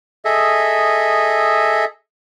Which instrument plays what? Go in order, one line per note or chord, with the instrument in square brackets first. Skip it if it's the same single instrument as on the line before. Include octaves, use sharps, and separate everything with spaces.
[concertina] G#4 A4 D#5 E5